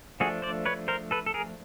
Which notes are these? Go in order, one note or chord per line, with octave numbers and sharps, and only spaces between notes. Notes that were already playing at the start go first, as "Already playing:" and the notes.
F3 A3 D4 F#4 G#4
C5 D5
B4 C#5
A#4 C5
A4 B4
A4
G#4 A#4